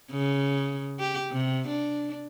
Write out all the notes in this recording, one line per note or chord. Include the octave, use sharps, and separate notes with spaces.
C#3
G4
C3
D4